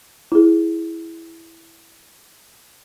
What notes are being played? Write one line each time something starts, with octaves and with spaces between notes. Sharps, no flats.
E4 G#4